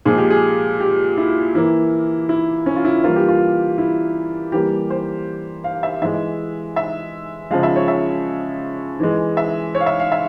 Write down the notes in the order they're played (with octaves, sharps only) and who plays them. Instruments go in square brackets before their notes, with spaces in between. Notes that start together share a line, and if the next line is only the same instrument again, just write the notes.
[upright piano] A#2 F3 G#3 G#4
G4
G#4
G4
E4
E3 A#3 E4
E4
C#4
F4
E4
E3 G3 A#3 F4
G4
F4
E4
E3 G3 A#3 G4
C5
F5
E5
E3 G#3 E5
E5
C#3 F3 G#3 F5
E5
C#5
E5
E3 G#3
E5
C#5
F5
E5
F5
E5